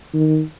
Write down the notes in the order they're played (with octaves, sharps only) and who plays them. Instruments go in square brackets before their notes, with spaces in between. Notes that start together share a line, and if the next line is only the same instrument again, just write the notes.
[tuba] D#3